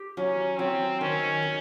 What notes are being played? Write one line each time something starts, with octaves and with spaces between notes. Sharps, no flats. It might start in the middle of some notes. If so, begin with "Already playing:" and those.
Already playing: G4
F#3 C#4
F#3 C4
D#3 C#4
D#3